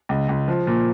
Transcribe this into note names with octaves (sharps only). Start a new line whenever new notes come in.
C#2
C#2
F3
A#2